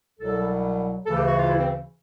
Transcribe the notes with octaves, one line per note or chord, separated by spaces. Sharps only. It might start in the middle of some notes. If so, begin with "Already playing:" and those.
C2 B2 F#3 A4
D2 C#3 E3 A4
G4
F#4
F4
E4
C4